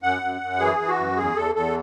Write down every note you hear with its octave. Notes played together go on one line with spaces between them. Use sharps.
F#2 F#5
F#2
F#2
E3 G#4
E3
F#4
F#2
E2 G#4
E2 A4
E2 A4